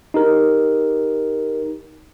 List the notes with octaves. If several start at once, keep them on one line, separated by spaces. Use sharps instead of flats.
D#4 G4 A#4